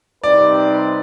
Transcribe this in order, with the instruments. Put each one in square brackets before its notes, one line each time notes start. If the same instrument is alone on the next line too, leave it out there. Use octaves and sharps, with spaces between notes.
[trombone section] C3 G3 C4 D#4 B4 [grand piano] D5